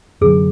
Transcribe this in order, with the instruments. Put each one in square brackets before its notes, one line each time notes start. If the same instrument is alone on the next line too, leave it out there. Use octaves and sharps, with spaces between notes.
[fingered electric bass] F#2 D3 F#3 [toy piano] G#4